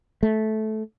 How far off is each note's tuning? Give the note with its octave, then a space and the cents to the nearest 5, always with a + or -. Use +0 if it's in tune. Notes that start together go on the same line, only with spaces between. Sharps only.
A3 -15